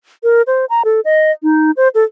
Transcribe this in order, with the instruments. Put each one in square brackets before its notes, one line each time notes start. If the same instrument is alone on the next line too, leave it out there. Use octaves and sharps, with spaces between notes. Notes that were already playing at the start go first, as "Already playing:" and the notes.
[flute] A#4
C5
A#5
A4
D#5
D#4
C5
A4